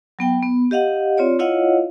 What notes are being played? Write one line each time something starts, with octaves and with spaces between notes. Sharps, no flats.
F#3 B3 G5
B3
G4 D#5 F5 F#5
C4 F4 C#5 D5
E4 F4 C#5 D#5 F5 F#5